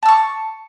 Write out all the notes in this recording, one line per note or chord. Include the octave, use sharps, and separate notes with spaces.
A5 C#6 E6